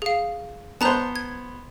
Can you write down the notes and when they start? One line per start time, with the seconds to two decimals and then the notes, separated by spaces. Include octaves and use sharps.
0.02 G#4 F5
0.81 B3 C5 A5 A#5 F#6
1.16 G#6